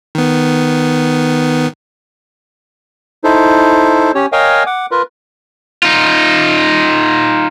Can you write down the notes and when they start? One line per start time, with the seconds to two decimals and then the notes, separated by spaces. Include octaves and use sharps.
0.15 D#3 B3
3.24 D#4 E4 A4 C5
4.15 C#4 G4 C#5
4.32 A#4 C#5 D#5 F5 G5 G#5
4.66 F#5 D6
4.91 F4 A#4 B4
5.83 D#4 F4